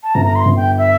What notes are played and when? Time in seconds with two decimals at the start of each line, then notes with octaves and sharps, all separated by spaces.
0.03 A5
0.15 G1 A#5
0.26 A#5
0.35 C6
0.46 G1
0.56 G5
0.78 E5